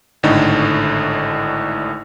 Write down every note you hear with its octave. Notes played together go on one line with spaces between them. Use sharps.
G#1 A2 D3 D#4